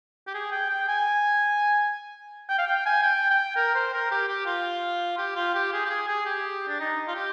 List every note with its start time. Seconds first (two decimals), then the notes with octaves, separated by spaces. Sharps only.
0.27 G4
0.34 G#4
0.52 G5
0.70 G5
0.88 G#5
2.49 G5
2.59 F5
2.67 G5
2.86 G#5
3.03 G5
3.30 G5
3.56 A#4
3.75 C5
3.93 A#4
4.11 G4
4.29 G4
4.46 F4
5.18 G4
5.36 F4
5.54 G4
5.73 G#4
5.86 G4
5.90 G#4
6.07 G#4
6.26 G4
6.68 D4
6.80 D#4
7.08 F4
7.15 G4